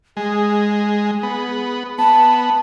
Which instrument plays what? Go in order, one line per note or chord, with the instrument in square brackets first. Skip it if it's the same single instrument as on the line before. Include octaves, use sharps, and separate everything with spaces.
[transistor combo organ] G#3 [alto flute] G#4
[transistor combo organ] B3
[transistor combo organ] B3 [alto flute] A5